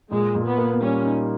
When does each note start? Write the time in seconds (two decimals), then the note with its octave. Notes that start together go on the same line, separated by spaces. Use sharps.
0.11 A#2 G#3
0.35 A#2
0.46 B3
0.58 A#3
0.81 G3 C#4
1.05 D#4